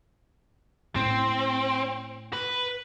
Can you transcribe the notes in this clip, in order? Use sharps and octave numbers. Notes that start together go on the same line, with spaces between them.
A2 C4
B4